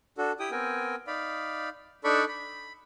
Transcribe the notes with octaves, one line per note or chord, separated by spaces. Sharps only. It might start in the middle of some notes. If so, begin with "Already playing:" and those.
D4 F#4 A4
E4 G4 G5 D#6
B3 C4 A#4 G5 G#5
D#4 D5 F5 B5
D4 D#4 A4 D5 B5 C#6
B5